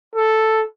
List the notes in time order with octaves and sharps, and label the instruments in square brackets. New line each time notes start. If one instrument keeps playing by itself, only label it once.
[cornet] A4